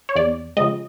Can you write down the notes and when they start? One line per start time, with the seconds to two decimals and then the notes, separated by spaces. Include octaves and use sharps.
0.09 C#5
0.16 E2 D5
0.57 C#3 F3 G#3 D#5